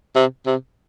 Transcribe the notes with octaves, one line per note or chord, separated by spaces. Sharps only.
C3
C3